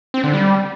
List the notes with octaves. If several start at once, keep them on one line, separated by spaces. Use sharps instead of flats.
C4
D3
G3